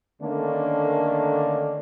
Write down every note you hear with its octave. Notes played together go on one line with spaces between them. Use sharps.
D3 D#3 A3 A#3 C#4 D4